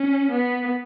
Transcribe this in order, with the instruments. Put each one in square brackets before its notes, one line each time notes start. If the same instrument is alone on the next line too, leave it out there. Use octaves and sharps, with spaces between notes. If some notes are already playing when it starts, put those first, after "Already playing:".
Already playing: [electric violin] C#4
B3